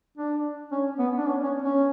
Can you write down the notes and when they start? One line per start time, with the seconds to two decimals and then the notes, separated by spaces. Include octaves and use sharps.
0.18 D4
0.72 C#4
0.99 B3
1.18 D4
1.26 C#4
1.44 C#4
1.62 C#4